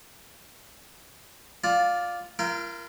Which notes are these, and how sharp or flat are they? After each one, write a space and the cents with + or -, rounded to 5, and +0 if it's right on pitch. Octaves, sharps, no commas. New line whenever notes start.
F4 +10 D5 +0 A5 -15
F4 -40 A#4 +0 G5 +0